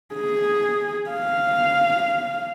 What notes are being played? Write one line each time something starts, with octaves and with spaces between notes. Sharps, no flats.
G#4
F5